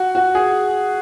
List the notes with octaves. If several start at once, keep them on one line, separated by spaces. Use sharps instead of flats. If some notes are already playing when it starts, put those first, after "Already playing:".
Already playing: F#4
F#4
G#4